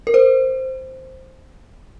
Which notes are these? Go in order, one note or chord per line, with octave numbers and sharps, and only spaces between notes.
A#4
C5